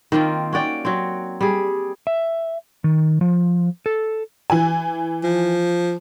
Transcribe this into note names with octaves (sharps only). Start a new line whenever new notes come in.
D#3 A#3 C4 F4
C#4 F#4 D5 G5
F#3 C4
G3 G#4
E5
D#3
F3
A4
E3 G#5
F3